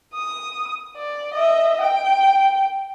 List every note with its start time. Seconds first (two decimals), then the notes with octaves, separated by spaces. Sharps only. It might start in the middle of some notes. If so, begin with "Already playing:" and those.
0.14 D#6
0.97 D5
1.34 D#5 E5
1.81 G5